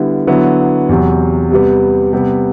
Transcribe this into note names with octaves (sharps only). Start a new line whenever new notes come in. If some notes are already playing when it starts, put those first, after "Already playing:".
Already playing: D3 G3 B3 E4
D3 F#3 B3 E4
E2 C3 F#3
C3 G3 B3
C3 G3 B3